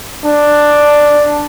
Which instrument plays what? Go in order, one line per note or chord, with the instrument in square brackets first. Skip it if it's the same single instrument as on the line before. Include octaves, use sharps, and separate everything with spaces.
[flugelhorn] D4